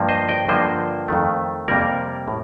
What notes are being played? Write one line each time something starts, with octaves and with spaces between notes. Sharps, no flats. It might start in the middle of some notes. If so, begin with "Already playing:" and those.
Already playing: G2 F3 A#3
C5 D#5
D#5 G5
G2 D3 F3 A#3 C5 D#5
F2 D#3 A3
F2 C3 G3 A#3 A#4 D5
A2